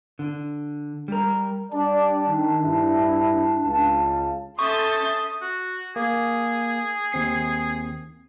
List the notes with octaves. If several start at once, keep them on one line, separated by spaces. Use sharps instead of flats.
D3
G3 A#4
G3 D4 D5
D#3
G2 E4
C#2 F5 A5
C#4 A4 E5 C6 C#6 D#6 G6 A6
F#4
A#3 G#4
D#2 C4 C7